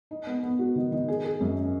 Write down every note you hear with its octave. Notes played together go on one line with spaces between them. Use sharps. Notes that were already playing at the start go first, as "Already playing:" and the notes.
D#4
B3
B3
F#4
D#3
D#3
G#4
G#4
F#2